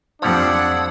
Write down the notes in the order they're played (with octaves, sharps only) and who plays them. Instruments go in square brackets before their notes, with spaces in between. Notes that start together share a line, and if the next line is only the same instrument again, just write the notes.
[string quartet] F2 F#5 [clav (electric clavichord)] F3 G3 [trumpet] D4 [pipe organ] D#6 E6 G#6